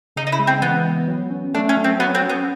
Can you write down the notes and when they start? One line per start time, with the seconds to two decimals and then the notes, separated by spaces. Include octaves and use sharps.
0.16 C#3 D#4
0.27 D#4
0.32 E4
0.39 G#3
0.47 C4
0.62 E3 B3
0.85 B3
1.08 F#3
1.30 C#4
1.54 A3 D4
1.69 C#4
1.77 F#3
1.84 C4
1.99 F#3 B3
2.15 C4
2.22 C#4
2.29 B3